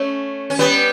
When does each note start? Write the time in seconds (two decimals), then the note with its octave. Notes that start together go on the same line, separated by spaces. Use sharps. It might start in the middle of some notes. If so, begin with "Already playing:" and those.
Already playing: A3 C#4
0.50 C#4
0.59 G3 B3